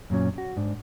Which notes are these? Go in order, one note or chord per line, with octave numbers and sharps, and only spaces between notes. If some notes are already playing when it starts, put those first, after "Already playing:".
F#2 A#2 F#3 C#4
F#4
G#2 D4